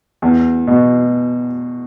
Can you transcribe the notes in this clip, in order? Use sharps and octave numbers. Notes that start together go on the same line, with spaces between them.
E2
B2